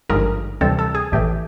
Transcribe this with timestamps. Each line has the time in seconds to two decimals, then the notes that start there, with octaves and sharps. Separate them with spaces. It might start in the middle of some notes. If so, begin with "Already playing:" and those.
0.09 G#1 G2 D3 F3 G#3 A#4
0.61 D2 C3 E3 G3 C4 A4
0.79 A4
0.95 G#4
1.12 A1 A2 E3 A3 G4